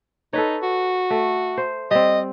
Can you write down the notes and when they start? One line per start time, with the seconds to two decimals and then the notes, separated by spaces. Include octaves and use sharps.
0.33 D#4 A4 B4 C#5
0.63 F#4
1.11 A3
1.58 C5
1.91 G3 C4 D#5